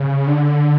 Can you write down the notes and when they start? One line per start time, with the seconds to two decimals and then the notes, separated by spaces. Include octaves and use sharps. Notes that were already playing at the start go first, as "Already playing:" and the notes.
Already playing: C#3
0.27 D3